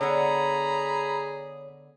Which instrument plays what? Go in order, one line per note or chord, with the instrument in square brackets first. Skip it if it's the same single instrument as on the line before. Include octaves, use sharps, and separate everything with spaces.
[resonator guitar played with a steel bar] D3 B3 [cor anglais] G#4 [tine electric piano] C#5 [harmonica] A#5 B5